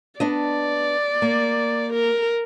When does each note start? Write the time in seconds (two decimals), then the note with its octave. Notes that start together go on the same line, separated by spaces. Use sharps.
0.20 B3 D4 D5 D#5
1.22 A#3
1.93 A#4